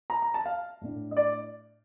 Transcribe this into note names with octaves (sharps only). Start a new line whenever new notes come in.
A#5
A#5
A5
F5
A2 A3 D4
D#5
D5